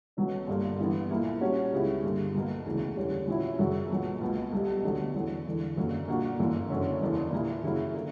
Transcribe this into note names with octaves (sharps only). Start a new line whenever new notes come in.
B1 B2 F#3 C#4
G1 G2 D3 A#3
G2 E3 B3
B1 A#2 A#3 E4
A#2 G3 C#4 F#4
C#2 C#3 G3 B3 E4
G1 G2 D3 A#3
B1 B2 A#3
E1 D2 C#3 E3
F#1 E2 D3 G3 C#4
A#1 A#2 F#3 C#4 E4
F#2 C#3 F#3
B1 A#2 F#3 B3
C#2 B2 A#3
B1 B2 G3
D2 D3 F#3 B3
E2 D3 F#3
E1 E2 D3
F#1 F#2 D3 F#3 A#3
A#2 A#3 D4 F#4
G1 F#2 E3 A#3
F#1 F#2 D3 F#3 C#4
F#1 E2 D3 A#3 D4
A#1 A#2 A#3 E4
F#2 C#3 F#3 A#3 E4
D3 A#3